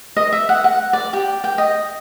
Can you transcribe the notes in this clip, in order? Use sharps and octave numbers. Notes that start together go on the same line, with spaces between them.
D#5
E5
F#5
F#5
D5
G4
G5
D#5